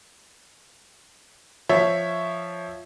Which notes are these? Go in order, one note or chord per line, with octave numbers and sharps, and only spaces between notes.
F3 C#5 E5